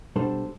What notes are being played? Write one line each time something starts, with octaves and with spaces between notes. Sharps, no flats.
B2 G3 D4 A4 C5